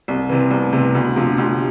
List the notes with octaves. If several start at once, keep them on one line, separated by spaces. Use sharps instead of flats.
C2 C4
C3 E3
C2 B3
A3
C3 E3 B3
A3
D2 B3
D4
C3 F3 B3
F4
D2 G4